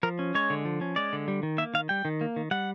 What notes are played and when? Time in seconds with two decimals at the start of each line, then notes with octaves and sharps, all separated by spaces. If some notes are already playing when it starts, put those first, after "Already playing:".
0.03 F3 A#4
0.19 C#4
0.35 G#3 C#5
0.50 D3
0.65 F3
0.81 C#4
0.96 G#3 D5
1.13 D3
1.28 G3
1.43 D#3
1.58 A#3 E5
1.74 D#3 F5
1.89 G3 G5
2.05 D#3
2.21 A#3
2.36 D#3
2.51 G3 F#5